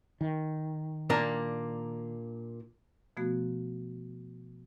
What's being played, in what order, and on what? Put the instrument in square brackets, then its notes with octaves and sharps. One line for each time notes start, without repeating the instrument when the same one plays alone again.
[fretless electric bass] D#3
[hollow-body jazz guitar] A#2 A#3 D4
[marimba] B2 F3 A3 B3 F#4